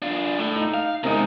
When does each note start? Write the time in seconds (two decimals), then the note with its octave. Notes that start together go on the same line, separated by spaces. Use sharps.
0.02 D4 F4
0.38 A2 A3
0.56 D#4
0.74 F5
1.03 C3 G#3 A#3 C4 D#4